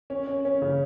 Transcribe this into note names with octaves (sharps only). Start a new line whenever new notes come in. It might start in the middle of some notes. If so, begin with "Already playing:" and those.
C#4
C#4
C#4
C#3